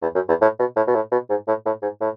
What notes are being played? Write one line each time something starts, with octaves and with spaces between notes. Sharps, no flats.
E2
F#2
E2
A2
B2
A2
B2
A2
B2
G#2
A2
A2
G#2
A2